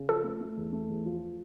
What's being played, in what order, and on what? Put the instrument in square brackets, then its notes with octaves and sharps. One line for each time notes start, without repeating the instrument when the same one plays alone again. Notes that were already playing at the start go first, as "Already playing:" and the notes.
Already playing: [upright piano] C#3
[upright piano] F3 [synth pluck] A4
[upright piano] A3
A3
E2
A3
E2
F3